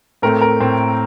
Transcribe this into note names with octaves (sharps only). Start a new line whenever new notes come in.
A2 A3 C4 A#4
A#4
A2 A3 C4